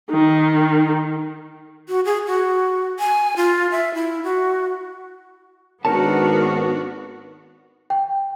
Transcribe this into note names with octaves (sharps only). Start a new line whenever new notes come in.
D#3
F#4
G#4
F#4
G#5
F4
E5
E4
F#4
G#1 B3 D4 D#4 F#4 A#4 C#5 A5
G5